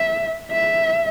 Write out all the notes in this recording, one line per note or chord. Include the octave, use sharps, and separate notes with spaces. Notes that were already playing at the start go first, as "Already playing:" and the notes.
Already playing: E5
E5